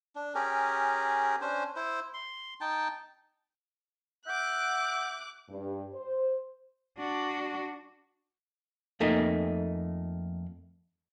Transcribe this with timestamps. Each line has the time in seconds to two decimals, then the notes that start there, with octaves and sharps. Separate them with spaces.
0.15 D4
0.35 C#4 G4 G#4 A#4
1.41 C#4 D4 C5
1.76 E4 C5
2.14 C6
2.61 D#4 G5 A5
4.27 E5 F#5 D6 F#6 G6
5.50 G2
5.94 C5
6.98 D4 F#4
9.00 F2 A3 A#3 D#4